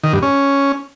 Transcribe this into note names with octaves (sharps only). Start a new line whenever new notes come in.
D#3
G2
C#4